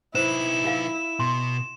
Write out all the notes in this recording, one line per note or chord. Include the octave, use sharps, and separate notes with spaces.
D#4 E4 B4 C5 E7
F4 F5
B2 C6